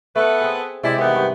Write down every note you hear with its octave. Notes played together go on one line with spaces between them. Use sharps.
A3 B3 A4 B4
C4 G#4
C3 G#3 E4 G4 D5
D#3 E3 B3 G4
G2